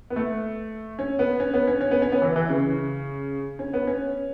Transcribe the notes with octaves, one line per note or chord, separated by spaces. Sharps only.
B3
A3
C#4
B3
C#4
B3
C#4
C#4
B3
C#4
B3
E3
E3
C#3
C#4
B3
C#4